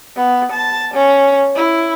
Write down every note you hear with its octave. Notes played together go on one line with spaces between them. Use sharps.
B3
A5
C#4
E4